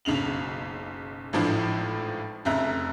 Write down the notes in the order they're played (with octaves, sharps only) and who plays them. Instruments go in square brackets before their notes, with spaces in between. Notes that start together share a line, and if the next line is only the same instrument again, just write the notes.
[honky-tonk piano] F#1 B1 C#3 F7 F#7
G#1 A2 E3 F3 D4 F4
F1 F2 C#3 E5 A#5 F#6